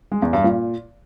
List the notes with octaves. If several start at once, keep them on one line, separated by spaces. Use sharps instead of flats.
G#3
E2
G2
A#2